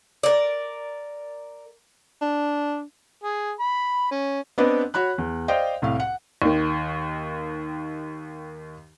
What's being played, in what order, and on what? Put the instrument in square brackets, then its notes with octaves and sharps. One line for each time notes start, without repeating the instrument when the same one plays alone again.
[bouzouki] A#4 D5
[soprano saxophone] D4
[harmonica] G#4
B5
C#4
[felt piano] B3 C4 D4 B4 D#5
F#4 C#5 B5 F#6
E2
C5 D5 D#5 F5 G5
C2 A2 F5
F#5
[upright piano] D#2 D#3